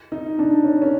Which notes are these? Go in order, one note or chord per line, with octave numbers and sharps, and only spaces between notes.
D#4
D4
C#4
C#4